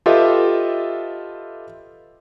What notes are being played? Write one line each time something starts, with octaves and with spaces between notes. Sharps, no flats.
F4 G4 A4 B4 D#5 E5